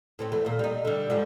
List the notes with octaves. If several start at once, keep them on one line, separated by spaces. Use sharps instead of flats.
A2 C4 C#4
E2 A3
D#2 A#2
G3 D#4
D3 G3
G#2 F3 G3